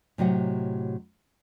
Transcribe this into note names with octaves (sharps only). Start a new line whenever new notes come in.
A2 C3 F#3 D#5 F#5